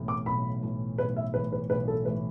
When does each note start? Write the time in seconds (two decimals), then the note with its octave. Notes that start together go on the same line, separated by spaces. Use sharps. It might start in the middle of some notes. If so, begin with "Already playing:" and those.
Already playing: B1 A2 E3
0.08 D6
0.26 B1 B5
0.63 A2 E3
0.98 B1 B4
1.16 E5
1.34 A2 E3 B4
1.52 B4
1.70 B1 B4
1.88 A4
2.05 A2 E3 B4